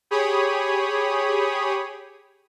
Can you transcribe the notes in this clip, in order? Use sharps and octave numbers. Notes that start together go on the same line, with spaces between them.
G4 G#4 C#5 B5 D#6